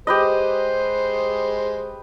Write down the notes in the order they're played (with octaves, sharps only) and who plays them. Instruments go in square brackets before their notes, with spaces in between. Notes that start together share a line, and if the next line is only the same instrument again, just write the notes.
[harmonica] G#3 C5 [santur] G4 B4 D#5